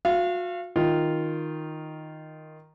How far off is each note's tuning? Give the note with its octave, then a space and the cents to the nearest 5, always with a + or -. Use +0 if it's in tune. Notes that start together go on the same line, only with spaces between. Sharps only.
F#4 -40 F5 -25
D#3 +0 F4 +0